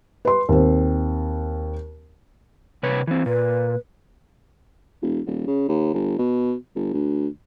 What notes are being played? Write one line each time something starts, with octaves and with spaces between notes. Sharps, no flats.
B4 C6
D#2 C4
C3 B4 C#5
E3 C4
A#2 B4
E1
D#1
C#3
D#2
G1
B2
G1
D2